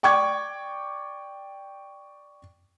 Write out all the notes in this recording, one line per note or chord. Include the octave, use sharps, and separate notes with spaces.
D5 G5 C#6 D6 G#6